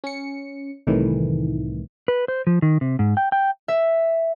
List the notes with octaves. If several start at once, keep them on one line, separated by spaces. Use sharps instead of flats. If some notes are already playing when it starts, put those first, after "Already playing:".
C#4 C#7
C2 A2 D#3 E3
B4
C5
F3
D#3
C3
G#2
G5
G5
E5